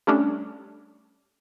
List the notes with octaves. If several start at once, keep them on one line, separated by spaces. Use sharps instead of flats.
G3 A3 C#4 D4